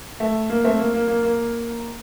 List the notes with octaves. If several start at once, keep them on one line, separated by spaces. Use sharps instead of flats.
A3
A#3
A3 C4
A#3
A#3
A#3
A#3